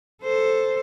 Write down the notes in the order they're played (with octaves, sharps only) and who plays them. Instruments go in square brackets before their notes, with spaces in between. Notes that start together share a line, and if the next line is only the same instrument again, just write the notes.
[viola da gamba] A4 C5